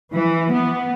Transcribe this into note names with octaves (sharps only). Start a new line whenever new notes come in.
E3
B3